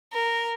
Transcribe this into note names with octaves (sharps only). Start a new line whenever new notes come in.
A#4